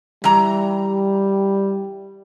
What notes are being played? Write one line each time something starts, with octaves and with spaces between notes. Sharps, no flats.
E3 G3 A#5